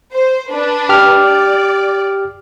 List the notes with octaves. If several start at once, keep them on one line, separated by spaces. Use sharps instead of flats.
C5
D4 B4
G4 F6
D5